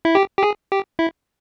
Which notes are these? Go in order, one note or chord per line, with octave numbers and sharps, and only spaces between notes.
E4
G4
G4
G#4
G4
E4